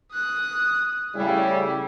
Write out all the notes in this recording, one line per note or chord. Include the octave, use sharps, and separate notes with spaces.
D#6 F#6
A2 C#3 G3 E4